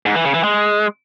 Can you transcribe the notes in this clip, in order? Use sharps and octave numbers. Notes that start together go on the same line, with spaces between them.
G#2
E3
C#3
E3
G#3